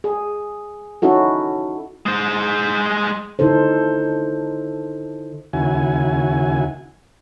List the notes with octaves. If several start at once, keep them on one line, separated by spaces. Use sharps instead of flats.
G#4
C#4 D#4 E4 F#4 A4
G#3 C5
D3 D#4 E4 A4 C5
D#2 C#3 E4 F#4 G#5